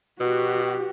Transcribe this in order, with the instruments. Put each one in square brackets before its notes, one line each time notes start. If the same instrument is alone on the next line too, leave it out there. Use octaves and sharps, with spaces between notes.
[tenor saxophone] B2 [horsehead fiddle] F#4 G4